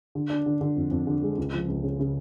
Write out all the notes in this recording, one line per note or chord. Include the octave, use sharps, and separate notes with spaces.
D3
D4
D3
D3
F2
F2
D3
G#3
C#2
F3
C#2
C#3
C#3